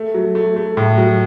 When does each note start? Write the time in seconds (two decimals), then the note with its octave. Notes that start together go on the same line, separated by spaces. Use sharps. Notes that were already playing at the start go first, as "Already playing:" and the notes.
Already playing: A3
0.14 F#3
0.35 A3
0.56 A3
0.77 A2
0.97 F#3